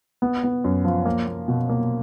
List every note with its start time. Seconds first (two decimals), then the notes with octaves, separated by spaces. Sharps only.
0.22 B3
0.43 B3
0.64 F#2
0.84 F3
1.06 A#3
1.27 A#3
1.48 B2
1.69 A#3